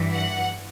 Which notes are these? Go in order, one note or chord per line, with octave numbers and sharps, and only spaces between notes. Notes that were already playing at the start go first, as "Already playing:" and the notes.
Already playing: G2 E3
F#5